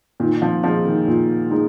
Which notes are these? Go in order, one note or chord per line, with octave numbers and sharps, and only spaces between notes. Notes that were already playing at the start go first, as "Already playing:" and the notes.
A#2 D#3
F3
F3 G#3 D#4
D#3
A#2
G#3 D#4